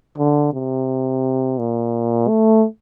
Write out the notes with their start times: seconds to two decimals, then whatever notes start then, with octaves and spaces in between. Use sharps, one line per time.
0.18 D3
0.53 C3
1.58 A#2
2.28 A3